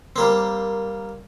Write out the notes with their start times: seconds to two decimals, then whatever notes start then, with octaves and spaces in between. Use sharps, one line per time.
0.16 G3 A#3 C4